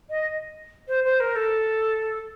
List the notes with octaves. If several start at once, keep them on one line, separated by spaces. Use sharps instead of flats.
D#5
C5
C5
A#4
A4